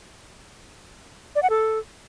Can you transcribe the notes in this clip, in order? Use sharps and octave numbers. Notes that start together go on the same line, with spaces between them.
D5
F#5
A4